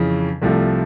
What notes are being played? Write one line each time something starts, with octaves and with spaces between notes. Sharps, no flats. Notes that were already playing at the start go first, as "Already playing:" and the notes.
Already playing: F2 C#3 E3
C2 C3 F3 A3